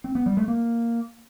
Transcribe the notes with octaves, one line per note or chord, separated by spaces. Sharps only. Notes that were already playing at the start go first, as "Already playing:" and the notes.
C4
B3
G3
A3
A#3